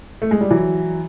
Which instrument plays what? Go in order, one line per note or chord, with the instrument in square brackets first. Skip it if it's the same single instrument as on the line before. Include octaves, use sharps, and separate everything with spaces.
[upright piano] A3
G#3
G3
E3 F#3